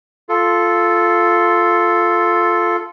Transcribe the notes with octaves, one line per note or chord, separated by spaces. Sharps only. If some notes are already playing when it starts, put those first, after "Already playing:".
F4 A4